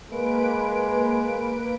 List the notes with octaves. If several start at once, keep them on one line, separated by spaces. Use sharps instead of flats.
G#3 A#3 B4 D7